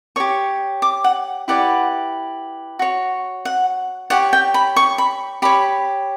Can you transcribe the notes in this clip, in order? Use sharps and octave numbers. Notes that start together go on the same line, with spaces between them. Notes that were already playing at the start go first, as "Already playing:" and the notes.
G4 C#5 C#6
D6
F#5
E4 G4 B4 D5 F#5
F#4 C#5
F#5
G4 C#5 F#5
G5
B5
C#6
B5
G4 C#5 B5